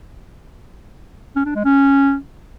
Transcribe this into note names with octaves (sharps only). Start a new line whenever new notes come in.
C#4
D4
G#3
C#4